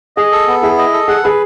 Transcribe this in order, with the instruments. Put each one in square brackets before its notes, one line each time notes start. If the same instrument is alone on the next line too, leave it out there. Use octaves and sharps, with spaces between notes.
[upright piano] G#4 [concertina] D#5
[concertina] A4
B3
[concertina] E4 [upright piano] G#4
[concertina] D#5
A4
[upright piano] G#4 [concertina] F#5
[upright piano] G#4 [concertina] B4